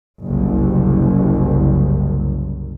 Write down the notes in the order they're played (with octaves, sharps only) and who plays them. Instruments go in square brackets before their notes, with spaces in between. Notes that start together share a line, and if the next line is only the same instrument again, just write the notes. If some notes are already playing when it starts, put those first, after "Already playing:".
[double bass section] F#1 C2